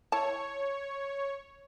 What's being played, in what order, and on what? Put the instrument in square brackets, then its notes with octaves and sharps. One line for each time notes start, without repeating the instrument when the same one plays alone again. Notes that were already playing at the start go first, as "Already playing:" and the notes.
[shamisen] E4 A5 [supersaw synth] C#5